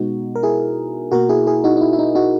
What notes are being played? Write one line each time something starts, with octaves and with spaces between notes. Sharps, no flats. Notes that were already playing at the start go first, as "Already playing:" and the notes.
Already playing: B2 G#3 B3 D#4 F#4
A#4
E4 G#4
B2 A#3 F#4 A#4
E4 G#4
E4 G#4
D#4 F#4
D#4
E4
E4
D#4
D#4 F#4